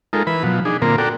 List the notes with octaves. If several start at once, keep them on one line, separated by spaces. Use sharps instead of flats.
G#3 D#4 F4 A4 A#4
E3 B4 B5
B2 F3 F#3
D4 D#4 G#4
A#2 D3 A#3 C4 F4 A#4
F#4 A4 A#4 D5 G5